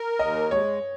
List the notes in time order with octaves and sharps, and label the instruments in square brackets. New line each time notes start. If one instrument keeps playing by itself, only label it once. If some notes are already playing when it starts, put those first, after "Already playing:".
Already playing: [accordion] A#4
[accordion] D#2 [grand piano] D#5
[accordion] G#3 [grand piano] C#5